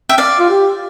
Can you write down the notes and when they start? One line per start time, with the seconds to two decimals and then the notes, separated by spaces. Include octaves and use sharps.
0.09 E5 G5
0.18 D5 F5
0.40 F4
0.50 G4